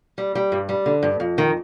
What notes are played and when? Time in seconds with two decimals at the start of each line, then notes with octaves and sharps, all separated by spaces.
0.18 G3
0.35 G3
0.52 G2
0.69 G3
0.86 D3
1.03 G2
1.20 F2
1.38 D#3